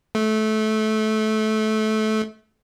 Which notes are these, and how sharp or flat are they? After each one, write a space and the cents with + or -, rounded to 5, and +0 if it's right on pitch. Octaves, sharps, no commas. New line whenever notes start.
A3 -20